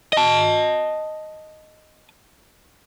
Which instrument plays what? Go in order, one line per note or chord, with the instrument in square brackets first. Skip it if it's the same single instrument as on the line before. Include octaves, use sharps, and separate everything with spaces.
[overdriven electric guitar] D#5 A5